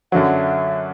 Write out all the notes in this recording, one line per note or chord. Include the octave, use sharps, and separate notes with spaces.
F#2 D3 F#3 E5 F#5